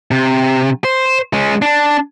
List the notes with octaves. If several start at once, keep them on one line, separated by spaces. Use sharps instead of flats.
C3
C5
G#3 C#4
D4